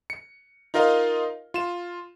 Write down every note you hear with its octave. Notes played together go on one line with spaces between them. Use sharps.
C#7
D#4 F4 A#4 D#5 F5
F4 E7